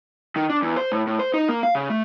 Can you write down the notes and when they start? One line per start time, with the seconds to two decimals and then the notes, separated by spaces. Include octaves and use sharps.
0.36 D#3
0.50 D4
0.62 E2
0.77 C5
0.92 A2
1.07 A2
1.19 C5
1.34 D#4
1.49 A#3
1.63 F5
1.75 C#3
1.90 A3